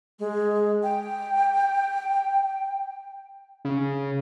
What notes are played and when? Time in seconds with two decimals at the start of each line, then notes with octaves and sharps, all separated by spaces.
0.19 G#3
0.83 G5
3.65 C#3